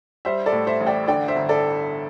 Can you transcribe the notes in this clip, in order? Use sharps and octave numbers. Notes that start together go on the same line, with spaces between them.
G3 C5 E5
A4 D5
A2
C5 E5
A1
D5 G5
D3 D5 G5
C5 E5
G1
A4 D5